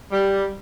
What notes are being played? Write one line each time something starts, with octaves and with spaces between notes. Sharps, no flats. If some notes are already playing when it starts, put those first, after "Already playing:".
G3